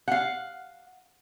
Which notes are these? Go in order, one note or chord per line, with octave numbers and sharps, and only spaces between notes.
F5 F#5